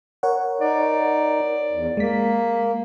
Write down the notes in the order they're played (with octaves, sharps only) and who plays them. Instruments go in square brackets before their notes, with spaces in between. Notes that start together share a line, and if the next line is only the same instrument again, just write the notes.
[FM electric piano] A#4 C#5 F#5
[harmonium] D#4 [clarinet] D5
[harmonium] E2
[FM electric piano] G#3 B6 [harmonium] A#3